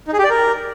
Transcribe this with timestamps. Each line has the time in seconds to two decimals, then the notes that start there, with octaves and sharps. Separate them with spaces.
0.08 D#4
0.13 G#4
0.19 G4
0.24 D5
0.30 A#4